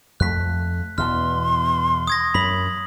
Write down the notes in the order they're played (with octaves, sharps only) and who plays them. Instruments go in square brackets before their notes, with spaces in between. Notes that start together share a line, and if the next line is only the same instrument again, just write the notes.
[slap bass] F2 A3 [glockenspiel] F#6 B6
[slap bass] E2 B2 E3 [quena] C6 [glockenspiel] F6
[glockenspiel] D#6 G#6 A#6
[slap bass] F#2 [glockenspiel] B5 B6 F#7